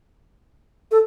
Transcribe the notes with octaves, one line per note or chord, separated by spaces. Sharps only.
A4